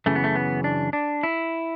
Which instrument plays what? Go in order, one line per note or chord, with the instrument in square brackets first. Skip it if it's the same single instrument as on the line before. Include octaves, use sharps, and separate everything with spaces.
[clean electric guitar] F#2 C#3 E3 A3
B3
A3
B3
D4
D4
E4